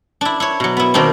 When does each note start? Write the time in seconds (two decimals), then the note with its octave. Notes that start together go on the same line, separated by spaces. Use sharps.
0.21 D4 E4
0.40 E4 C#5
0.60 B2 F#3
0.77 B3 E4
0.94 B2 D#3 A#3 C4 D4